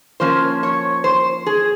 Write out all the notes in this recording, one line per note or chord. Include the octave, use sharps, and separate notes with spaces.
F3 A#3 C#4 C5
C#5
C5
G#4